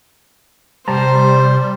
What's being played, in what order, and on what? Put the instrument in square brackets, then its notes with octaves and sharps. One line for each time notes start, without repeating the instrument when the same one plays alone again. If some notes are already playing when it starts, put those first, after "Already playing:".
[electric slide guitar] C3 A5 A#5 [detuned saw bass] G3 [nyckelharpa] C5